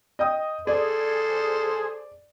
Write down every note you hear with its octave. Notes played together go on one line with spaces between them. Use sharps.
D#5 G5 D#6
G#4 A4 C5 D5